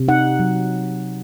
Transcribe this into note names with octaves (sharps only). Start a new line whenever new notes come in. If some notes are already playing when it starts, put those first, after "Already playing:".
Already playing: C3
D#4 F#5
F#3